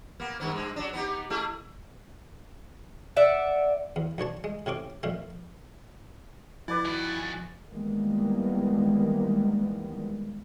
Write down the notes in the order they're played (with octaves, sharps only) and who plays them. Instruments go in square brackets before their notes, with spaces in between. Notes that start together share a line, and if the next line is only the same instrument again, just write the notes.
[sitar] A#3 B3
G2 D#3 B3
G2 G#3
F#3 D4
B3 D#4 G4
A3 E4 G#4
[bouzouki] D5 E5 F#5
[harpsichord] E2
B1 D4 C#5 A5
G#3
A2 C3 C#4 D6
F2 A#2 A3
[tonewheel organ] F3 G#5 A6 [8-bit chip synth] E4 [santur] B4 D5 F#5
[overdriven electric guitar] D#3 F#4 [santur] B5
[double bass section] D#3 E3 G3 G#3 A#3 B3